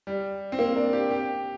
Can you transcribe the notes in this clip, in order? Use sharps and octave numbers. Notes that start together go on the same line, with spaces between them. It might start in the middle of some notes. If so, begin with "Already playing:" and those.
G3
C4
A#3
D4
G4
G4